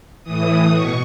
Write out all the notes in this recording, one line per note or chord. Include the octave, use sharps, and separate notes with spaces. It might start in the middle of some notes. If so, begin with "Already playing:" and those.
A2 E3 D#6
B2 C#6